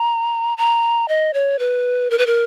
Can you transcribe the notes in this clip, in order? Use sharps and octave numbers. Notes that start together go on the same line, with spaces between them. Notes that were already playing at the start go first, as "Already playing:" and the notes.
Already playing: A#5
A#5
D#5
C#5
B4
A#4
B4
A#4